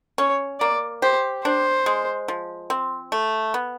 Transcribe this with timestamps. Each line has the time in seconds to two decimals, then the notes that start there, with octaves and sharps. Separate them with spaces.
0.18 C#4 C#5
0.60 A#3 D5
1.02 G4 C5
1.44 D4 C5
1.86 G#3
2.28 F3
2.70 C4
3.12 A3
3.54 B3